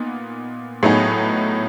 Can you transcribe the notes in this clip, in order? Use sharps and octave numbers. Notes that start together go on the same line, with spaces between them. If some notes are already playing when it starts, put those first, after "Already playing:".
Already playing: A#2 B3 D#4
A2 F#3 B3 D#4 G#4